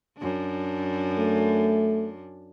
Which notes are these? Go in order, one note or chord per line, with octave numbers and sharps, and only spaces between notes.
F#2 D4
A3